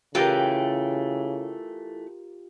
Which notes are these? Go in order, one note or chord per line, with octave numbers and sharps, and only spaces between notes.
C#3 E3 A3 F4 G4 A#4 G5